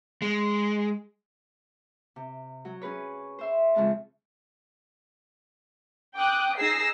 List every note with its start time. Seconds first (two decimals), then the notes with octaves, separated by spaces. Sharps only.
0.22 G#3
2.16 C3
2.65 F#3
2.82 C#4 G#4 B4 C#5
3.39 C5 E5 C6
3.75 F2 C#3 G#3 C4 A5
6.16 G5 D6 D#6 F#6
6.58 D#4 G#4 E6 A#6 C7